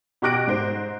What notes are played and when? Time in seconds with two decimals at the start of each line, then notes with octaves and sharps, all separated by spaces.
0.22 B2 G4 D6 F#6 A#6 D7
0.47 G#2 C5